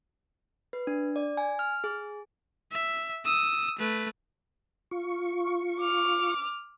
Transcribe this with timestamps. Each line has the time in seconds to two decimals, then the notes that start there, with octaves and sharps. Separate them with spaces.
0.73 B4
0.87 D4
1.16 D5
1.37 G#5
1.59 F6
1.84 G#4
2.72 E5
3.25 D#6 E6
3.79 A3 B4
4.91 F4 C#6
5.80 D6 F6